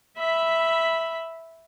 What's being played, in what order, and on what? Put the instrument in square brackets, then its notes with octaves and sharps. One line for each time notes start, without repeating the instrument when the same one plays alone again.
[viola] E5 B5